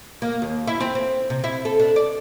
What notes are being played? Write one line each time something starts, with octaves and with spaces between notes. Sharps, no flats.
A#3
D#2
E4
C4
C4
C3
E4
A4
D4
D5